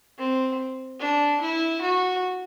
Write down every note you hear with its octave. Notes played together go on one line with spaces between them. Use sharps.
C4
D4
E4
F#4